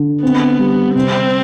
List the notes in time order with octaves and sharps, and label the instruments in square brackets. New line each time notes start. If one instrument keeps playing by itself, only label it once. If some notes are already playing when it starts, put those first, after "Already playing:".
Already playing: [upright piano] D3
[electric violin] B3 [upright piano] C4
[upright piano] G3
[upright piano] C3 [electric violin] C4